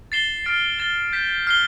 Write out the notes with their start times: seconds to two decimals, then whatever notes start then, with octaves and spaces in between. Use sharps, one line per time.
0.12 A6 C7 E7 G7
0.46 F6 A6 D7
0.79 A6 E7 G7
1.13 G6 B6 E7
1.47 F6 C7 G7